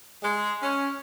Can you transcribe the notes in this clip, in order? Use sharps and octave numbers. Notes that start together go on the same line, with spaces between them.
G#3
C#4